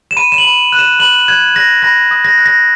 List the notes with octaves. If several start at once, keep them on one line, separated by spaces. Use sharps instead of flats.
E7
B5 D#7
E7
F#7
B5
F#6
E7
B5 F#7
F#6 G#6
F#6 A#6
B5 A#6
D#6
A#6
F#6
A#6